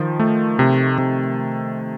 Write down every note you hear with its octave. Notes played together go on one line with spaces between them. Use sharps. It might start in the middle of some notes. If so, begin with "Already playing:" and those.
Already playing: D#3 F3
A3
C3
C3